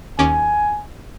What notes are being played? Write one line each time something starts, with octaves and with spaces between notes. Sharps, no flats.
D#2 C#4 G#5 D6